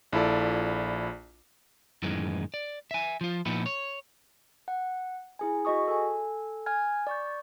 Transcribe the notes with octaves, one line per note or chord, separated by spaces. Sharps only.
A#1 E4 F4 A4 D5
F#2 A2 D#3 E3 G#3
D5
E5 G#5
F3 F4
A#2 F3 B3 D#4 E4
C#5
F#5
E4 G#4 G#5
F#4 G#4 D#5 C#6 D#6
A4 G#5
G#5 F6 G#6
D5 C#6 G6